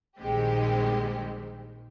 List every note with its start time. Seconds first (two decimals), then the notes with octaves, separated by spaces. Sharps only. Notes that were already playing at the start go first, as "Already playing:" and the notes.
0.19 A#1 D#3 G3 G#3 C4 G4